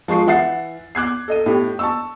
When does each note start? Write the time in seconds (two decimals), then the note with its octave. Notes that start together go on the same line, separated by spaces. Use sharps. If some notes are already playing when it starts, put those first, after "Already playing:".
0.08 F3 G#3 C#6 C7
0.27 E3 E5 F#5 A6 C7
0.95 D6 F#6 G#6 C7
1.28 A4 D#5 D#7
1.46 A2 G4 G5
1.79 A5 C#6 E6